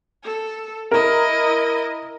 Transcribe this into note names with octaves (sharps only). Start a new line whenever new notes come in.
A4
E4 A#4 D#5